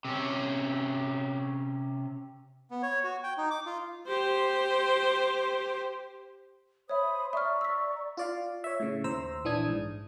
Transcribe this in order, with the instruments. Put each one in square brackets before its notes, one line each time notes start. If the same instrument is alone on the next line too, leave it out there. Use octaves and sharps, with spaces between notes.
[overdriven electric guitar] C3 C#4
[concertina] B3
C#5
F#4
G5
D#4
D6
F4
[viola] G4 C5
[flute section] C5 B5 D#6 [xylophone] C#5 E5
[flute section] D5 A#5 C#6 [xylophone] E5 F6
[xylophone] E6 B6
[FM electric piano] F4 D5 F5
C#5 E5
A2 C#3
D#2 C5 A#5 E6
A#1 E3 D4 D#6 G#6
G#2